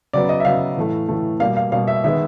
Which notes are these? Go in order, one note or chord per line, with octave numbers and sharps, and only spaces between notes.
C#3 F#3 B3 D5
D#5
E5
C#3 F#3 B3 F5
A2 E3 A3
A2 E3 A3
B2 G3 A#3 F5
F5
B2 G3 A#3 F5
E5
D#3 G#3 B3 E5